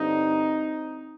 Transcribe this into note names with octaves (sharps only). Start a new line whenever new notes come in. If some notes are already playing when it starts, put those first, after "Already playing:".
Already playing: G2 D3 C4 D#4